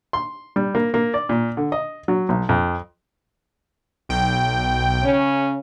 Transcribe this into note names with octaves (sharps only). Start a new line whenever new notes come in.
C6
G3
A#3
A#3
D5
A#2
D3
D#5
F#3
B1
F2
B1 G5
C#3 C#4